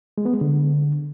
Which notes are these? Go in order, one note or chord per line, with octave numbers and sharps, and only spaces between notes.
G#3
B3
G#3
D3